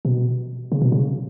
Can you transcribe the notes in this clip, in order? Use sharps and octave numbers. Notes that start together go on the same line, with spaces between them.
B2
C#3
B2
C#3